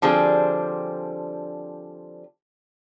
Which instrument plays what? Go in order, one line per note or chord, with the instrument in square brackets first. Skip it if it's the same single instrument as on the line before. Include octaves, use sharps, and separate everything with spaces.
[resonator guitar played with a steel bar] D3 F3 G3 C4 G#4